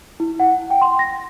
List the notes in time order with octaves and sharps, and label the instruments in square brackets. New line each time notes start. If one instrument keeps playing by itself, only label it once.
[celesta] E4
F#5
G5
C6
A#6